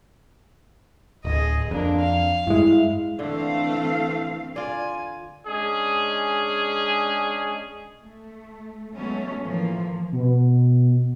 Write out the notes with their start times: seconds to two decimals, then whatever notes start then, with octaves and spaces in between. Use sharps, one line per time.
1.25 D1 G#4 D#5
1.71 F2 A#3 D4
2.01 F5
2.47 G2 G#3 E4
3.19 D3 E3 A3 C4 F5
4.56 F4 D5 G#5
5.47 G#3 C#4 D4 G#4
8.01 A3
8.93 F#3 G#3 A3 B3 C#4
9.42 A2 E3 F3 A#3
10.12 B2